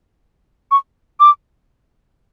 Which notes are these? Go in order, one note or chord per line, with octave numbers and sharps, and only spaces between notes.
C#6
D6